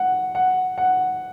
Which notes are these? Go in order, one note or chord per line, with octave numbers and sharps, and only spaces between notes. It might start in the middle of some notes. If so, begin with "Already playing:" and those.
Already playing: F#5
F#5
F#5